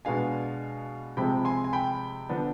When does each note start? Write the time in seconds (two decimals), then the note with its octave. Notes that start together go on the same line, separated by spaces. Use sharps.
0.05 B2 G#3 B3 D4 F5 G#5
1.17 C3 F3 G#3 C4 G5 B5
1.45 G#5 C6
1.64 G#5
1.73 G5 B5
2.30 D3 F3 B3 D4